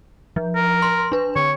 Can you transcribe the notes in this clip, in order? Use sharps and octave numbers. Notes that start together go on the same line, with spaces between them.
F3
A#4
C6
D4 B4
D3 C#5